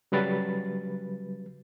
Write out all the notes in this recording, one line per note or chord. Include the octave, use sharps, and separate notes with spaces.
C#3 F#3 G3 B4 A6